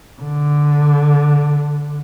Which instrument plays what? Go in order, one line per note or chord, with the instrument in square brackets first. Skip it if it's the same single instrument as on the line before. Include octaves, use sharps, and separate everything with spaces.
[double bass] D3